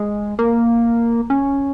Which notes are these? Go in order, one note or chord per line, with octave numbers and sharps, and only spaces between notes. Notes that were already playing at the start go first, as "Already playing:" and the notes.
Already playing: G#3
A#3
C#4